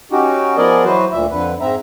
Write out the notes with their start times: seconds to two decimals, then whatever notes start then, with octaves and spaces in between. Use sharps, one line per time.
0.12 C#4 D#4 F#4 G4
0.57 F3 B3 G#4 A#4 D5 D#5
0.84 E3 F#3 F#4 B4 C5
1.12 D2 A#2 E5
1.31 F2 D3 B4
1.61 G#2 C4 E5 A#5